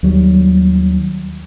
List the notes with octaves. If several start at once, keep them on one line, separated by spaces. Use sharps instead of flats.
D#2 F#3 G3